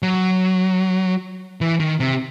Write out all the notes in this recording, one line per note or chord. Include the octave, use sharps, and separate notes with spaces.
F#3
E3
D#3
C3